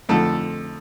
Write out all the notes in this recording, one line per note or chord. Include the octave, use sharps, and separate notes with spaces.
F2 D3 F3 A3 A4